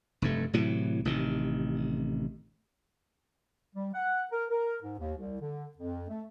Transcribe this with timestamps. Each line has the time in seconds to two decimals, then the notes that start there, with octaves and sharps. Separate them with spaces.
0.22 F1 G2 A3
0.53 A2 C3 E3 F#3
1.05 A1 C3 D#3
3.75 G3
3.94 F#5
4.31 A#4
4.50 A#4
4.82 G#2
4.98 D#2
5.17 C2
5.40 D3
5.77 F2
6.09 A3